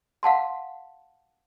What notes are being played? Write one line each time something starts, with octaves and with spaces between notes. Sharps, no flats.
F5 F#5 A5 C6